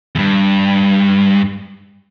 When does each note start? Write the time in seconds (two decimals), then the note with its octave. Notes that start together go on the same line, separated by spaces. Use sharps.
0.15 E2 G2